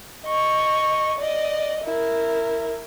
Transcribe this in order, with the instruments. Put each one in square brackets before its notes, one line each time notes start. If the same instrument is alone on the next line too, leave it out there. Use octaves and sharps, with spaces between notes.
[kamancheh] D#5 C#6
D5 D#5
E4 A#4